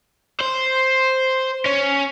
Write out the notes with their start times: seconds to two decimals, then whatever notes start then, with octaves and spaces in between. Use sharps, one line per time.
0.40 C5
1.66 C#4